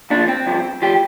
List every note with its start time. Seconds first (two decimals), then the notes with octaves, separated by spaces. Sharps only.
0.10 A#2 F3 D4
0.28 C4
0.46 G2 F3
0.82 F3 G4